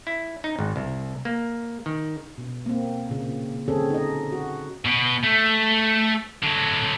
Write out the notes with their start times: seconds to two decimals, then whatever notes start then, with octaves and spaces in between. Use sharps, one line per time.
0.07 E4
0.44 D#4
0.59 G#1
0.76 C2
1.25 A#3
1.86 D#3
2.38 B2
2.66 A#3 C4
3.09 A#2 C#3
3.68 D3 F#3 C4 C#4 G#4 A4
3.90 D#4 D#5
4.32 F#4
4.85 B2
5.24 A3
6.43 D3 F#3